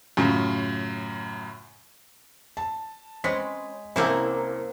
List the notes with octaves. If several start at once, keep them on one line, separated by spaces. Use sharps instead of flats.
F#2 A2 C#3 F4
A5
G#3 C4 C#4 B4 B6
C2 A#3 C4 C#4 E4 A4